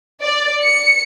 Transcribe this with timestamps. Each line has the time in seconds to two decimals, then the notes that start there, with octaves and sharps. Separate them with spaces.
0.22 D5
0.63 C#7